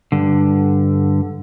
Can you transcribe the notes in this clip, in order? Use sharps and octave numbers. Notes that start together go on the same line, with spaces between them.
G2 D3